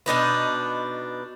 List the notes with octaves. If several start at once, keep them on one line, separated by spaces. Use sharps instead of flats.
B2 D4 D#4 B4